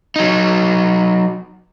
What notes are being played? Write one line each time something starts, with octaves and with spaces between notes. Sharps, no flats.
F#3 D#4